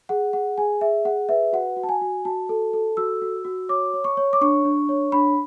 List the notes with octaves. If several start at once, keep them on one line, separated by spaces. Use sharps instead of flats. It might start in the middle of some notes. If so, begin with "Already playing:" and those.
G#4 F#5
G#4 F#5
G#4 G#5
G#4 E5
G#4 F#5
B4 E5
F#4 F#5
F#4
A5
G#5
F#4
F#4 A5
A4
A4
F#4 E6
F#4
F#4
C#5 D6
C#5
C#6
C#5
D6
D4 C#6
D4
C#5
D4 B5